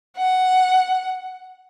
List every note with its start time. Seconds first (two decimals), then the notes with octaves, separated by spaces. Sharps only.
0.17 F#5